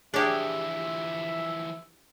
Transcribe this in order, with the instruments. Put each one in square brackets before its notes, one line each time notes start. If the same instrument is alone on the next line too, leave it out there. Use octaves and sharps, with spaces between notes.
[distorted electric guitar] E3 F3 [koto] D4 G4 [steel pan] G#4 C#5 G5 [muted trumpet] E5